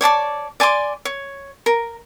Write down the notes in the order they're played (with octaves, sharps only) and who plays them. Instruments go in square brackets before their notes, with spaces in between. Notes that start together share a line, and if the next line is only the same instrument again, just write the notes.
[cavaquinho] C#5 D5 A5 D6
D5 G#5 C6 D6
C#5
A#4